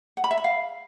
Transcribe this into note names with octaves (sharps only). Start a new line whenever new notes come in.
F#5
B5
E5
B5
F5